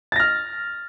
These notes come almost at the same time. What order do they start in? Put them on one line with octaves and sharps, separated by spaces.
A6 A#6 F6